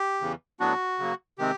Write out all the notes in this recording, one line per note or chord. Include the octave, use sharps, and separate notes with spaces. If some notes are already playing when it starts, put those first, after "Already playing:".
Already playing: G4
E2 C#3 E3
A2 F#3 B3 D4 F#4
C#3 F#3 A#3
C3 D#3 G#3 C4 G4